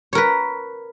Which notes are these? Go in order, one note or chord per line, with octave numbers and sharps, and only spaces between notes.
A#4 B4 C#5